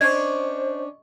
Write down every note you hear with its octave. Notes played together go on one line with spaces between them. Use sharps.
C#4 D4 C5 D#5 C#6 G#6